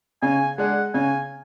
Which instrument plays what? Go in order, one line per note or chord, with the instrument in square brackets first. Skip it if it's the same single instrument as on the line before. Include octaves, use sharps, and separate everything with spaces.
[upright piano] C#3 [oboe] G#5
[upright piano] G#3 D4 G#4 [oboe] F#5
[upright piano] C#3 [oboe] G#5